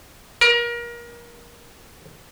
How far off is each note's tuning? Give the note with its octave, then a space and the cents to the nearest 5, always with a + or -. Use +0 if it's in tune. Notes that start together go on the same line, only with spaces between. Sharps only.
A#4 +30